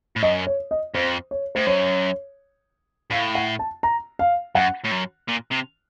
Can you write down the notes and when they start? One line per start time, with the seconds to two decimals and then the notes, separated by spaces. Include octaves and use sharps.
0.16 A2
0.23 F#2 D#5
0.47 C#5
0.71 D#5
0.94 F2 C5
1.31 C#5
1.55 A2 C5
1.66 F#2 C#5
3.11 A2 F5
3.35 F#5
3.59 A5
3.83 A#5
4.19 F5
4.55 F#2 F#5
4.84 A2
4.91 F#2
5.28 A#2
5.51 C3